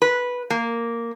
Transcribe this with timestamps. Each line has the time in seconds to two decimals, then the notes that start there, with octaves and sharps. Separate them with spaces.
0.02 B4
0.50 A#3